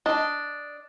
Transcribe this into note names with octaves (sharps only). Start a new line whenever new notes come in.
D4 D#5